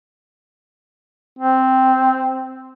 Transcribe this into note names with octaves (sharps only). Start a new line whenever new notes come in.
C4